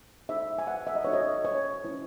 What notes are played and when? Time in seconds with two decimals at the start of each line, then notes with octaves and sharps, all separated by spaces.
0.29 D#4 G#4 C5 E5
0.59 G#5
0.67 F#5
0.87 E5
0.95 D#5
1.05 D#4 F#4 A4 C5 C#5
1.13 D#5
1.45 C#5
1.84 C#4 E4 C5